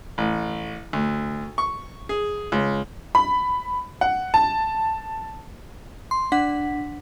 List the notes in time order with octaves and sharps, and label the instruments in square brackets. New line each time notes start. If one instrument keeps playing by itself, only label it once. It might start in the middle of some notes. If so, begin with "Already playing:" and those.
[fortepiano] A1
D2
C#6
G#4
C#2
[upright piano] B5
F#5
A5
[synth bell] C6
D4 F#5 B6